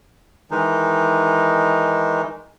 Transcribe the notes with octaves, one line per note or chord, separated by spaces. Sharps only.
D#3 E3 G#3 D#4